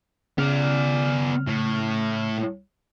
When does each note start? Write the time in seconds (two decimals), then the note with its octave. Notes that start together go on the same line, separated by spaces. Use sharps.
0.38 C#3 B3 D5 F6
1.47 A2